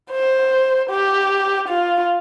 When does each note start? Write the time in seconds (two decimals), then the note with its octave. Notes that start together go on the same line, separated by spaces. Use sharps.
0.12 C5
0.90 G4
1.68 F4